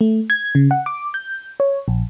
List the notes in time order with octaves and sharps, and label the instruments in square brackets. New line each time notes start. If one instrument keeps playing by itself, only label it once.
[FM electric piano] A3
G#6
C#3
F#5
D6
G6
C#5
A#1